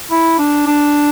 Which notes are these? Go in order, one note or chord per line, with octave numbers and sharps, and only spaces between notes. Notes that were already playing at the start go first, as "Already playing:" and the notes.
E4
D4
D4